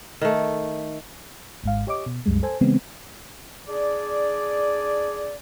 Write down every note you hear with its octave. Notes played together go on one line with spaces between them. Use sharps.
D#3 A3
G#1 G#2 F5
G4 C#5 D#5 D6
B2
C2 F#2 G3 G#3
A4 C5 G#5
C#3 E3 G#3 B3 C4
D4 G#4 D5